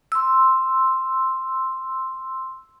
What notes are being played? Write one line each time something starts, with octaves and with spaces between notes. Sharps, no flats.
C6 E6